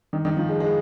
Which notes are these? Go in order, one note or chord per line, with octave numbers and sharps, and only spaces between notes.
D#3
D#3
F3
G#3
G#3